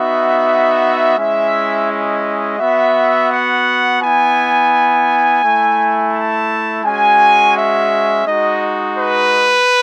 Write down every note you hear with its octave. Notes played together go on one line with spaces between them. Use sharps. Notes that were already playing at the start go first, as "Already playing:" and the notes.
Already playing: B3 D#4 F#4 E5
G#3 C#4 E4 E5
D#5
B3 F#4 E5
F#5
B3 E4 G#5
A3 E4
A5
G#3 C#4 F#4 G#5
E5
G#3 D#4 F#4 D#5
B4